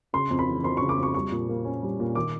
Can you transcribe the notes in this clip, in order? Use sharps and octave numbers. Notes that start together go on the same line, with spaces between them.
C#3 C6
F2
B5
E3
F2 C6
C#3 C#6
D6
F2 C#6
G3 C#6
A#2
A#3
C#4
G3
A#2
D#3 D6